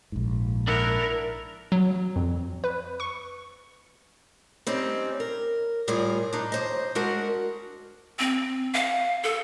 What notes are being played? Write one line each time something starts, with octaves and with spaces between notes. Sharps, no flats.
A#1 G#2
D4 E4 A#4 F#5
F#3
F2
B4
C#6
G3 C4 C#4 D#4
A#4
A2 G3 F4 G#4 A#4 G#5
D4 D#4
D#2 C5 D#5
G#3 D4 F#4 A#4 F#5
C4
F5
A4